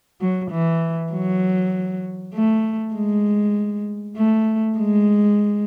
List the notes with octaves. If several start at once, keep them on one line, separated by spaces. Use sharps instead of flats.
F#3
E3
F#3
A3
G#3
A3
G#3